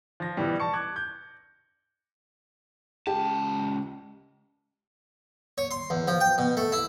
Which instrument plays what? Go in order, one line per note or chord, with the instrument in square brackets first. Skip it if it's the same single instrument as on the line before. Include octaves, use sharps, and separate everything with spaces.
[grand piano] F3 A#6
B2 E3 G3
A5 C#6 C#7
D6 F#6 G#6
G6
[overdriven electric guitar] C#2 A5 [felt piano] G4
[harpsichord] C#5
C6
E2
F3
G5
B2
A3
E4